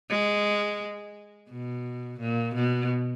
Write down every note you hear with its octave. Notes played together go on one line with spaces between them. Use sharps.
G#3
B2
A#2
B2